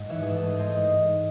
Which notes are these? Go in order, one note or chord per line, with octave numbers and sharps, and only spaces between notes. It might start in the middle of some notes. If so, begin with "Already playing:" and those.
Already playing: G#2 G#3
E3 C#5 E5
G#2 G#4
A4
A3
A3 C5 D#5
G#2
G#2